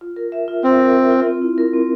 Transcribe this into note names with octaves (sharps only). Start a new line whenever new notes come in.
F4
A#4
E5
F4
C4 F4
A#4
E5
F4
C4
E4
A#4
C4